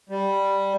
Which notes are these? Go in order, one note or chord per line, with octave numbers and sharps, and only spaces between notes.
G3